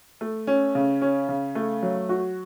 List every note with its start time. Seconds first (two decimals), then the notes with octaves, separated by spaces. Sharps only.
0.21 A3
0.47 C#4
0.75 C#3
1.02 C#4
1.29 C#3
1.55 A3
1.83 F#3
2.09 F#4